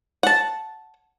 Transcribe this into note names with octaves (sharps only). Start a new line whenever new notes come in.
F#5 A5